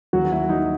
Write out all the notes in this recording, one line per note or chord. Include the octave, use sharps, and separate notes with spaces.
D#2 F#3 F#4
F#4
A#3 E4
F#3 D#4